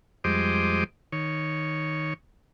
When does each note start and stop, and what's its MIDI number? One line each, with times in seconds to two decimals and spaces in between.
0.24 0.84 41
0.24 0.84 55
0.24 0.84 56
0.24 0.84 72
0.24 0.84 75
0.24 0.84 86
1.12 2.14 51
1.12 2.14 73